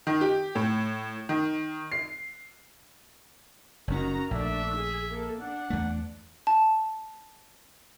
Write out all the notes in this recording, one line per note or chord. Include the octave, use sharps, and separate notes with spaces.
D#3
G4
A2
D#3
C7
F#1 F2 D#3 C#4 F#4 A#5
A#1 A3 D4 E5
G#4
A#3 A4
D4 F#5
E2 A3
A5